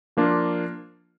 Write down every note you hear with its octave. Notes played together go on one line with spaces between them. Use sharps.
F3 A#3 D4 F4